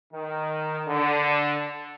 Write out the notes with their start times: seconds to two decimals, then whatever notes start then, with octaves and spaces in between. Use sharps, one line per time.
0.13 D#3
0.88 D3